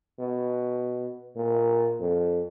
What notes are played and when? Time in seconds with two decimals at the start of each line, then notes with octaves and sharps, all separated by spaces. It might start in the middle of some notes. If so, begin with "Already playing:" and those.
0.19 B2
1.36 A#2
2.00 F2